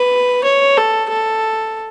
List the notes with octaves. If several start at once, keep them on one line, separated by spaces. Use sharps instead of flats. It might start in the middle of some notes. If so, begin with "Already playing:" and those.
Already playing: B4
C#5
A4
A4